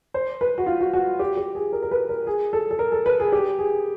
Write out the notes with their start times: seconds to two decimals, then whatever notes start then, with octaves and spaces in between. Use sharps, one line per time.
0.14 C5
0.41 B4
0.58 F#4
0.66 F4
0.81 F#4
0.93 F#4
1.19 G4
1.37 G4
1.55 G#4
1.72 A#4
1.83 A#4
1.91 B4
2.09 A#4
2.27 G#4
2.53 A4
2.71 A4
2.79 A#4
2.92 A4
3.06 B4
3.20 G#4
3.32 G4
3.59 G#4